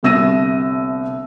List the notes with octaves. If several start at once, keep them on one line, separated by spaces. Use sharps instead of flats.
G1 C2 E6 A#6 D#7